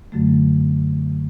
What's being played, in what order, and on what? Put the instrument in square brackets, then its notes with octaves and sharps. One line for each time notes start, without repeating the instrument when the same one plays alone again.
[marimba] F#2 D3 F#3 A3